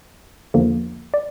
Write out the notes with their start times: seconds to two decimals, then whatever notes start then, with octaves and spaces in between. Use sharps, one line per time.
0.54 E2 D3 F3 A#3
1.14 D5